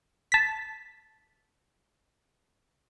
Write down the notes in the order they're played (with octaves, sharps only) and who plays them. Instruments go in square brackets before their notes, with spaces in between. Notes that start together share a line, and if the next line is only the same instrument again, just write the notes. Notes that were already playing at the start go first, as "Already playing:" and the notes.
[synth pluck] A5 B6